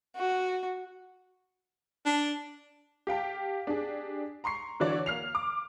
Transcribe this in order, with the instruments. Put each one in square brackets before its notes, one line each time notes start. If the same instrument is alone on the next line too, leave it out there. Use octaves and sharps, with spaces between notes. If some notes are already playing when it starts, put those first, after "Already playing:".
[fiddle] F#4
[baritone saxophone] D4
[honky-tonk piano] G4 F5 G5 A5
D4 G4 G#4
A#5 C6 C#6 C7
D3 E3 F#4 C#5 D5
A#3 F6 C7 F7
D6